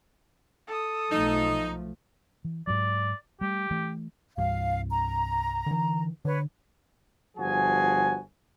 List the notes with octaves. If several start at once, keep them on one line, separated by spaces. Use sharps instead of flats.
A4 D#6
B1 F3 A3 D#4
E3
G#2 F#3 D5
G3 A3 G4
E3 A3
C2 G2 F5
A#5
D3 E3
D3 B4 C#5
G1 F3 F#4 G#4 G#5